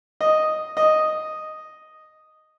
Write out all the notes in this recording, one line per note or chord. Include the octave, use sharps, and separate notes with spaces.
D#5
D#5